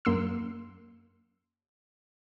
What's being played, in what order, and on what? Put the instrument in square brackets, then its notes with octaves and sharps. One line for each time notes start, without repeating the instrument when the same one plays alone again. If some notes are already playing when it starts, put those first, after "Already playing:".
[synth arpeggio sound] F#2 A#3 C6 E6